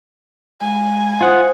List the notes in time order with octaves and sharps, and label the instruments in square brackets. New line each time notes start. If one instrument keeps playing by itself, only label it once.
[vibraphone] G#3 F5 [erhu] G#5
[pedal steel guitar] F4 F#5 [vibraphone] C5 D#6